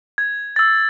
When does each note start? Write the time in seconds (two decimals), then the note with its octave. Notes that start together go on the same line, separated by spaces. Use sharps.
0.18 G#6
0.56 E6 A6